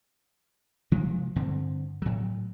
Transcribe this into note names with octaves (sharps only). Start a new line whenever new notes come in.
C3 F3 G#3 A#3
G2 D3 C4
A2 F#3